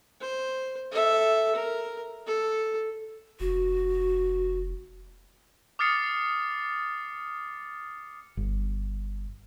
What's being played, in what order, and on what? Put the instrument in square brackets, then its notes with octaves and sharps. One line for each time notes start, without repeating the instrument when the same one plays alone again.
[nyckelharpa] C5
A4 E5
A#4
A4
[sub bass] F1 [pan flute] F#4
[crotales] D6 D#6 F6 A6 C7 C#7
[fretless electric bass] G1